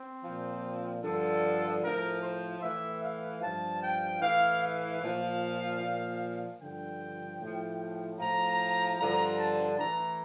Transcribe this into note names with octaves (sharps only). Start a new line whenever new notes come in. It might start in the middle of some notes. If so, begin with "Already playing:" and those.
Already playing: C4
A#2 F3
G2 D3 F3 A4
A2 F3 A#4
C5
A2 E3 E5
F5
G2 F3 A5
G5
A2 E3 F5
F5
A#2 F3
A#2 F3
G2 D3 F3 G5
A2 F3
A2 F3 A#5
G2 D3 F3 A#5
A5
A2 E3 A#5